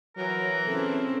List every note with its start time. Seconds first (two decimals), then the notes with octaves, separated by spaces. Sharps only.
0.17 E3 F#3 A#4
0.67 C#3 C4 E4 A4